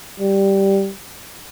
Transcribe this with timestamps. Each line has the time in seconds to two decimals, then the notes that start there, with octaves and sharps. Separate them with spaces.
0.20 G3